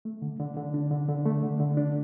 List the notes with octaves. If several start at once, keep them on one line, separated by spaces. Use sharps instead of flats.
A3
D3
D3
D3
D4
D3
D3
A3
D3
D3
D4